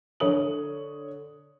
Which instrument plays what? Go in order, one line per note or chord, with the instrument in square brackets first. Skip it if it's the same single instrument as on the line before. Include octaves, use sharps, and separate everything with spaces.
[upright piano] D3 C#5 D#6 F#7